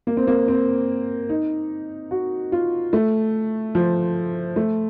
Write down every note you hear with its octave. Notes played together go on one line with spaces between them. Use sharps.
A#3
C4
A#3
C4
D#4
F#4
F4
A3
F3
A3